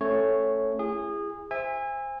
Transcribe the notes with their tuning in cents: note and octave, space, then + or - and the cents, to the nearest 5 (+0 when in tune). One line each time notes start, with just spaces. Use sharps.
A3 +0 C#4 -20 C#5 +0
E4 +30 G#4 -25
C5 +0 E5 +0 G#5 -30